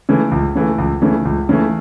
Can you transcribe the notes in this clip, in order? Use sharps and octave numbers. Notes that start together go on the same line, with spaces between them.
C#3 E3 A3
C#2
C#3 E3 A3
C#2
C#3 E3 A3
C#2
C#3 E3 A3